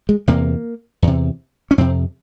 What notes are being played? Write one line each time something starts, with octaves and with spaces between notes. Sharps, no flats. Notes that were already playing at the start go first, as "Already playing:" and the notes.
G#3
E2 C3 A#3
E2 C3
C#4
F2 C3 C4